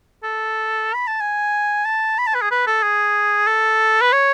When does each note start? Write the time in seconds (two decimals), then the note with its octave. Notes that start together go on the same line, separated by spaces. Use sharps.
0.23 A4
0.94 B5
1.07 A5
1.21 G#5
1.85 A5
2.18 B5
2.27 A5
2.35 B4
2.42 G#4
2.51 B4
2.67 A4
2.83 G#4
3.47 A4
4.01 B4
4.13 C#5